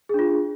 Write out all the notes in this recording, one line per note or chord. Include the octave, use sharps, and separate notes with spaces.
D4 F4 G#4